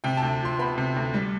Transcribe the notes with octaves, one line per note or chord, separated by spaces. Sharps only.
C3 G5
D2 A5
F3 C6
B3 B5
C3
D2
G3